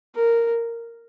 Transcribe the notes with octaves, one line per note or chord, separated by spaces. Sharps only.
A#4